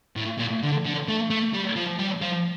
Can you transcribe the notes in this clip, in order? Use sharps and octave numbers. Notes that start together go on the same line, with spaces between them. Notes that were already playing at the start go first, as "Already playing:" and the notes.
A2
A#2
D3
D3
A3
A3
G3
F3
G3
F3